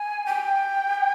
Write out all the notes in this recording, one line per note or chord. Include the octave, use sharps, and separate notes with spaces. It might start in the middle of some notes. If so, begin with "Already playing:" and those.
Already playing: G#5
G5